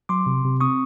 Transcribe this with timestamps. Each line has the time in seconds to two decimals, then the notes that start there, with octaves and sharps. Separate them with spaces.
0.09 F#3 C6 D6
0.26 C3
0.44 C3
0.60 C4 C#6 D#6